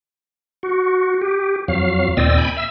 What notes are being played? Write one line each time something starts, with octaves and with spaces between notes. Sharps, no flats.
F#4
G4
F2 F#3 F5
D#2 A#2 C4 D5 D#5 E6
G5 G#5 B5
E5 E6